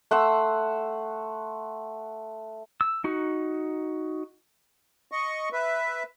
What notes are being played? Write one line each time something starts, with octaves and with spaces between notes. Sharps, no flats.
A3 F#5 C6 E6
E6
D#4 F#4
D#5 C#6
B4 E5